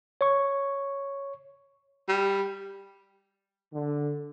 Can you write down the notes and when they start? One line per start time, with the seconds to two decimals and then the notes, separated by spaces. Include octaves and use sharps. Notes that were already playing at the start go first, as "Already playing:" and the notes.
0.21 C#5 C#6
2.09 G3
3.73 D3